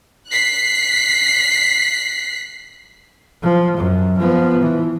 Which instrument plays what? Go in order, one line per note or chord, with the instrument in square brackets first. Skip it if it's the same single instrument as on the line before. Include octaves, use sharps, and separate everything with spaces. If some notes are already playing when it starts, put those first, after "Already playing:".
[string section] F#6 B6 C7
[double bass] F3
F#2
F3 B3
E3